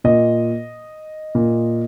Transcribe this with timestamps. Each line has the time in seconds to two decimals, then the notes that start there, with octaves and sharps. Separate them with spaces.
0.04 A#2 D#5
1.35 A#2